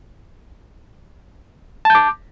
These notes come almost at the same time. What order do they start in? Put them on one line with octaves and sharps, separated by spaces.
A5 G6 D6